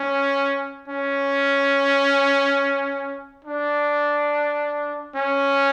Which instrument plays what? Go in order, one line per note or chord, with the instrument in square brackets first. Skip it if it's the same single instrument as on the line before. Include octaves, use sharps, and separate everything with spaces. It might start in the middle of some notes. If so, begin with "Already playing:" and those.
Already playing: [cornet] C#4
C#4
D4
C#4